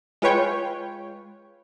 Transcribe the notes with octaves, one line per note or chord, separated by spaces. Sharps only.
G#3 F4 B4 C#5 G5